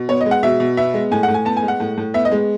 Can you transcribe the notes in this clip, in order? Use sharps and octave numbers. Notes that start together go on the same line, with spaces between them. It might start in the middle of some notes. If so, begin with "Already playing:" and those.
Already playing: B2
B3 C#5
D#5
G#3
F#5
B2 E5
B2
B3 E5
G#3
A2 G#5
F#5
A2
G#5
B3 A5
G#5
G#3
F#5
A2
A2
B3 E5
D#5
G#3